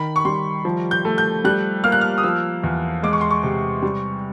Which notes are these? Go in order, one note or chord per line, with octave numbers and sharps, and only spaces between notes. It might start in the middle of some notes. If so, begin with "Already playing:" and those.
Already playing: D#3 B5
C#6
G3 C6
F3
G6
A3
G6
G3 F#6
A#3 F6
F#6
F6
D#6
F3 E6
E2
G#3 D6
C#6
C6
C#6
C3
G3